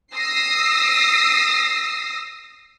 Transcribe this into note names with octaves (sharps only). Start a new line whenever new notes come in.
D#6 E6 A#6 C7